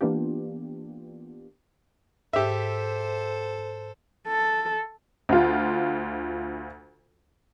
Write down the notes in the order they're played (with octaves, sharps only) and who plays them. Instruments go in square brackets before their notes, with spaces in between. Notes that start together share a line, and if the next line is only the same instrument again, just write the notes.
[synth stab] E3 A#3 B3 D4 F4 G4
[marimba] G#2 [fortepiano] G4 E5 [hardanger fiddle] A4 C5
[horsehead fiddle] A4
[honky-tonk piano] D2 F4